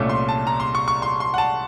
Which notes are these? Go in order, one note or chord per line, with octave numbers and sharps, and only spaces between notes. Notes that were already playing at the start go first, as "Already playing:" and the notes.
Already playing: C2 A#2 A3 C#4
C6
A5
A#5
C6
C#6
C#6
C6
C6
F#5
A5